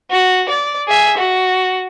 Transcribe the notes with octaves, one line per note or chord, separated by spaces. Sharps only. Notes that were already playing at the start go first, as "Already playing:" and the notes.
F#4
D5
G#4 E5
F#4